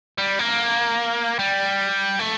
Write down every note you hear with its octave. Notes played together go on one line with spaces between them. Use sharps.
G3
A#3
G3
A3